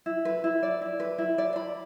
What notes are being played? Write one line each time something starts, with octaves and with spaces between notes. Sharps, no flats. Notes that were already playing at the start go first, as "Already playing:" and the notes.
E4
B4
E4
D5
E4
B4
E4
D5
B5